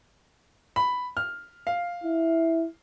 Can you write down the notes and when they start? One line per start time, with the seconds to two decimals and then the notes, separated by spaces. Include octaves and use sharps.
0.76 B5
1.17 F6
1.67 F5
2.04 E4